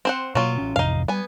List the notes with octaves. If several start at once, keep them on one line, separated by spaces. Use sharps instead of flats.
C4 C5 F#5
B2 F#3 A#3 F4
A1 C#4
A1 F2 C3 D#4 F5
G3 B3 G#5